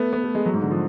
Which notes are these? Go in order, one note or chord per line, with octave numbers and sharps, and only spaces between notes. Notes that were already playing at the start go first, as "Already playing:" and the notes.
Already playing: A3 B3
B3
A3
G#3
F#3
G#2
D3
F3